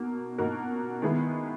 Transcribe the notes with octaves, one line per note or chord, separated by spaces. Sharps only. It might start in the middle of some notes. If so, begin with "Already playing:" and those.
Already playing: B2 A#3 D#4 F#4 A#4
B2 A#3 D#4 F#4 A#4
D#3 G#3 B3 E4 G#4